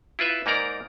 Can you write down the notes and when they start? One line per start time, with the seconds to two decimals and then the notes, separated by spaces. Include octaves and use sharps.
0.19 E4 F4 B4 E5
0.46 G#2 A#3 D#4 A#4 D5 A#5